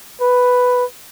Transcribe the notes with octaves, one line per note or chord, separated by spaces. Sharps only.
B4